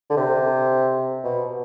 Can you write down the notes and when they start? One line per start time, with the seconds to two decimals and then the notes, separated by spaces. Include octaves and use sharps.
0.10 D3
0.17 C3
1.24 B2